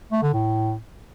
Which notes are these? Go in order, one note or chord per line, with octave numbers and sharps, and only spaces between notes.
A3
D3
A2